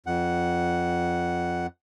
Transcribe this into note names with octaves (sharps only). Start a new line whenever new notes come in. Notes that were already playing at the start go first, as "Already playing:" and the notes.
F2 F#5